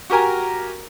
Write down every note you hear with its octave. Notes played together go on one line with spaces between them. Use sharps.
F#4 G4 A#4 G#5 A#5